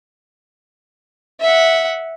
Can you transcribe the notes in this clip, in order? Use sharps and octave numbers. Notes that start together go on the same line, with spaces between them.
E5 F#5